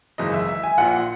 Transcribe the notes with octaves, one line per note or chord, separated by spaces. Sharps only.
G#1 F#2 C#3 E3 D#5
E5
E5
G#5
A#1 A#2 F#5